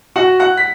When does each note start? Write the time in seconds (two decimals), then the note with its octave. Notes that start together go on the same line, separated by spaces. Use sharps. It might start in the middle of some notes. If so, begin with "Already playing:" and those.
0.16 F#4 F#5
0.40 F#5 F#6
0.57 B6